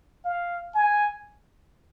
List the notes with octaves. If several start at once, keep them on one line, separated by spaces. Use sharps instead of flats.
F5
G#5